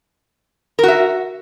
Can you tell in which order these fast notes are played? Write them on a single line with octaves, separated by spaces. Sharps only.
A#4 F#4 E5